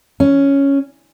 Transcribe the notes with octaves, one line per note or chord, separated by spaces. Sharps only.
C#4